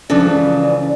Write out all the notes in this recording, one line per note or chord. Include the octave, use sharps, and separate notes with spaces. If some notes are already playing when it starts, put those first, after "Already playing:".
C#2 C#3 E3 F3 D4 A4 D5